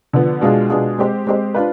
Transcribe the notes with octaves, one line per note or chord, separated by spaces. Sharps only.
D3 F3 B3
B2 G#3 D4 F4 G#4
B2 G#3 D4 F4 G#4
G#3 C4 G4 C5
G#3 C4 G4 C5
D4 F4 B4